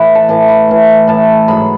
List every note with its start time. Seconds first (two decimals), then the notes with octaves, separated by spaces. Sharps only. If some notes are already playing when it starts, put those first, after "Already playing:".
Already playing: A2 E3 B4
0.15 A5
0.28 A2 E3 A5
0.48 B5
0.68 A2 E3
1.08 A2 E3 A5
1.48 G#2 F#3 B5